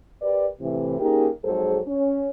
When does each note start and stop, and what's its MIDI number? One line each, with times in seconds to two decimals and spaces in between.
0.22 0.47 67
0.22 0.47 70
0.22 0.47 71
0.22 0.47 74
0.60 0.97 45
0.60 0.97 48
0.60 0.97 52
0.99 1.28 58
0.99 1.28 61
0.99 1.28 63
0.99 1.28 67
0.99 1.28 68
0.99 1.28 70
1.44 1.79 41
1.44 1.79 44
1.44 1.79 54
1.44 1.79 68
1.44 1.79 69
1.44 1.79 72
1.87 2.30 61